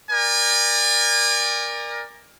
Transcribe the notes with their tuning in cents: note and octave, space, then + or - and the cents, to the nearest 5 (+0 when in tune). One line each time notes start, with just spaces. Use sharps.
A#4 +15 D5 +15 G#5 -35